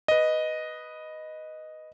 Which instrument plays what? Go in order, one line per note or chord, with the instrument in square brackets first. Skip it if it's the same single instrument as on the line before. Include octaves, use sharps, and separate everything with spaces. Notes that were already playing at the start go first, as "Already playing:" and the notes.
[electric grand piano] B4 D#5